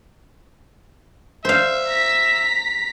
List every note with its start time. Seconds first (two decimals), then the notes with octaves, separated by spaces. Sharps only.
1.45 C5 E5 F5
1.88 A#5 B6